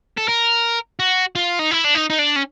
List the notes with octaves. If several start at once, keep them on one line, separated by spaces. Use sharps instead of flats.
A4
A#4
F#4
F4
D#4
E4
D4
D#4
D#4
D4
C#4